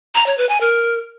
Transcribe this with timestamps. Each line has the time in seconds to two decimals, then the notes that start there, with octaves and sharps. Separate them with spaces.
0.15 A#5
0.26 C#5
0.38 B4
0.49 G#5
0.61 A#4